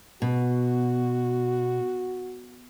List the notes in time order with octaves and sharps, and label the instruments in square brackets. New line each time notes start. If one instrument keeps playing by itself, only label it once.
[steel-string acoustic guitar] B2 [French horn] F#4